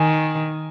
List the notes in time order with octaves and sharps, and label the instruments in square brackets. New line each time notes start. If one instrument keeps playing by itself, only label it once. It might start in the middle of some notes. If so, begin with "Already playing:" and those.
Already playing: [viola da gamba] D#3 [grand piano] G#5